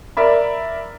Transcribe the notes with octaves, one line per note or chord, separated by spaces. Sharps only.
A#4 D5 E5 B5